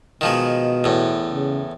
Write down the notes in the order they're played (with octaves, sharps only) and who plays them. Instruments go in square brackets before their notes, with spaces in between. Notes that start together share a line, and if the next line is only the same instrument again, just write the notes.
[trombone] B2 [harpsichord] D#3 F3 G#3
[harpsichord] E2 A2
[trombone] C#3